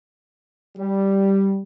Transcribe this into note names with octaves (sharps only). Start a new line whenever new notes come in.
G3